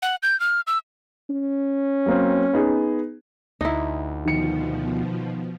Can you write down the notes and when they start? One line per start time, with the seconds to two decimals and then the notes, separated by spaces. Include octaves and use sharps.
0.02 F#5
0.23 G6
0.40 F6
0.67 E6
1.30 C#4
2.06 F#3 A#3 C4
2.53 B3 D#4 G#4
3.61 D2 D#4 E4
4.25 B2 D#3 F3 C#7